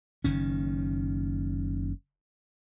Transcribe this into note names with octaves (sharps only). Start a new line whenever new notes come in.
F#1 D#3 C#4